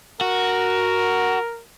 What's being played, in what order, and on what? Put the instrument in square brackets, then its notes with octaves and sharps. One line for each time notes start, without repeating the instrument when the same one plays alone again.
[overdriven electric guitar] F#4 [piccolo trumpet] A#4